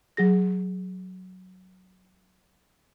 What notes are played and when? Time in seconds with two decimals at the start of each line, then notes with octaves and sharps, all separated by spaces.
0.17 F#3 G#4 A#6